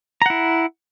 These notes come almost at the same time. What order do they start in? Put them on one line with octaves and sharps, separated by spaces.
A#5 F#5 E4